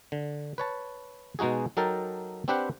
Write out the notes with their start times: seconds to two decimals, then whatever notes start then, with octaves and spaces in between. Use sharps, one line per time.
0.12 D3
0.58 B4 C#5 A5
1.39 B2 G#3 D#4 F#4 G#4
1.77 F#3 D#4 A4 A#4 G5 A5
2.48 C4 D4 G4 B4 C5 F#5